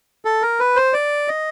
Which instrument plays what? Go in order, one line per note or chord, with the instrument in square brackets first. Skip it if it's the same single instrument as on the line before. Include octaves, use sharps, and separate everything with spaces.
[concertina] A4
A#4
B4
C5
D5
D#5